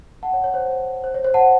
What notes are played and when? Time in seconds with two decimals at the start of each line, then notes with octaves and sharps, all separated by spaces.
0.23 F#5 A5
0.33 C#5
0.44 C#5
0.54 C5
1.04 C5
1.14 C#5
1.25 C5
1.34 F#5 A5